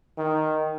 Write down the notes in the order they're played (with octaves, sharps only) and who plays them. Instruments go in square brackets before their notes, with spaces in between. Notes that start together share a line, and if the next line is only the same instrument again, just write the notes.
[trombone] D#3